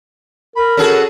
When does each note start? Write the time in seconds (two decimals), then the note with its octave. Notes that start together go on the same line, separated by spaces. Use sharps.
0.56 A#4 B5
0.77 C#4 F#4 G#4 A4